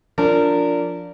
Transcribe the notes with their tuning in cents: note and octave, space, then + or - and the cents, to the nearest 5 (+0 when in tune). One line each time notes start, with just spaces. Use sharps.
F3 +0 D4 -15 A#4 -20